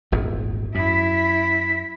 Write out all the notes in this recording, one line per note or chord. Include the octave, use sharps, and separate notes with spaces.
D#1 G#1 E2
F#2 E4 B6
B6